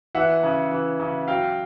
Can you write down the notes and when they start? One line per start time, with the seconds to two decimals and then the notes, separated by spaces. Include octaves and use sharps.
0.15 E3 E5 F#5
0.43 C#3
0.71 E3
1.00 C#3
1.28 F#3 F5 G5